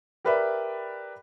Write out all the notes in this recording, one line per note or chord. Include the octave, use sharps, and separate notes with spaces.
G4 A#4 B4 D5 E5 B5